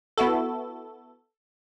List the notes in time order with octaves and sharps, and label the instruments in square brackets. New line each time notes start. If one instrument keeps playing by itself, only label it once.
[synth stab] B3 E4 F#4 A4